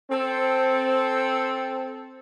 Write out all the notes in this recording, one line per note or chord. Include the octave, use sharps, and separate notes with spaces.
C4 A4